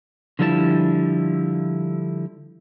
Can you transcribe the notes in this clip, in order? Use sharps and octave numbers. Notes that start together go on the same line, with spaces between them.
D3 F3 G3 E4 A4 A5